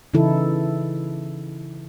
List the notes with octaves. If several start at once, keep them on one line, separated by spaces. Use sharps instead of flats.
C#3 E3 D#4 E4 A4